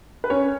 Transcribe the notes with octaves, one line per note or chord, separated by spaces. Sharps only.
B4
C#4 C#5